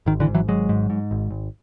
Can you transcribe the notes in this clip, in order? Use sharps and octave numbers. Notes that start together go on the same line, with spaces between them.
G#1 D#3
D3 E3
G#2
E3 F#3
G#1 F#3 G#3
G#2
G#2
G#1
G#1